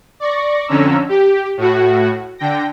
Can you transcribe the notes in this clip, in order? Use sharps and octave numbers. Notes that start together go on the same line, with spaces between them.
D5 C#6 A#6
F2 D3 C#4 A#5 E6
G4
A2 F#4
D3 G5 A#6